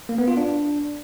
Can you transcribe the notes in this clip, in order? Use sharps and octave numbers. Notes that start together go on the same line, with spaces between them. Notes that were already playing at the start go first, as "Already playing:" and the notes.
A#3
B3
F4
D4